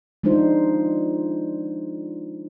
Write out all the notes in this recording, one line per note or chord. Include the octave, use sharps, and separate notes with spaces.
F3 G#3 D4 D#4 F4 C5